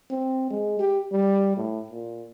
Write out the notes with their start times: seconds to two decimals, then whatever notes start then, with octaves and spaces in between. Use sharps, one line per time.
0.10 C4
0.50 G#3
0.79 G4
1.12 G3
1.57 A2
1.91 A#2